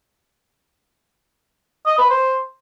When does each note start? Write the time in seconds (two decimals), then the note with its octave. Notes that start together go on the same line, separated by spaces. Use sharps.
1.86 D#5
1.98 B4
2.10 C5